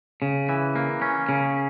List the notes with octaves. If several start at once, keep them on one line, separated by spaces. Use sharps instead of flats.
C#3
E3
A#3
C#4
C#3